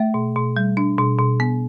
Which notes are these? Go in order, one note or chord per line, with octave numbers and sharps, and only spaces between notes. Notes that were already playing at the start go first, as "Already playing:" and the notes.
Already playing: A3 E5
B2
B2
G3
D4
B2
B2
B3